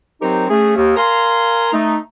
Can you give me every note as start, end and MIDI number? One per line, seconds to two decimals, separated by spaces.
0.22 0.46 54
0.22 0.46 60
0.22 0.46 63
0.22 0.46 67
0.22 0.46 70
0.22 0.46 72
0.49 0.76 57
0.49 0.76 61
0.49 0.76 68
0.76 0.95 39
0.96 1.69 70
0.96 1.69 77
0.96 1.69 80
0.96 1.69 82
0.96 1.69 84
1.73 1.98 57
1.73 1.98 63